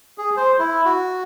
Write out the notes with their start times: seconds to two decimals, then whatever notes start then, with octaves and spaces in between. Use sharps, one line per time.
0.18 G#4
0.37 C5
0.59 E4
0.85 F#4